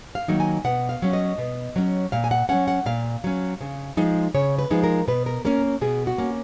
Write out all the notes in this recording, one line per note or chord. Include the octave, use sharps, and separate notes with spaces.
F5
D#3 F#3 A#3 D#4
G#5
B2 F#5
F5
F#3 C#4
D#5
B2
F#3 C#4
A#2 F5
G#5
F#5
F#3 C#4 F#5
F#5
A#2 F5
F#3 C#4
C#3
F3 G#3 D#4
C#3 C#5
B4
F3 G#3 D#4
A#4
B2 B4
A#4
A#3 C#4 A#4
B2 G#4
F#4
A#3 C#4